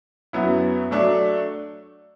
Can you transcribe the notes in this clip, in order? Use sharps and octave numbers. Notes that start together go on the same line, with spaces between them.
F#2 F#3 B3 E4
F#3 A3 D4 A4